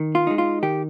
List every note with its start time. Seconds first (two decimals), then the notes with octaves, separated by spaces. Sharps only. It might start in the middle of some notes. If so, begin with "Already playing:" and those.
Already playing: D#3
0.15 F4
0.27 G#3 D#4
0.38 F4
0.63 D#3 G4